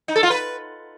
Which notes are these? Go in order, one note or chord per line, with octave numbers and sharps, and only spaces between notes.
D#4
A4
F4
B4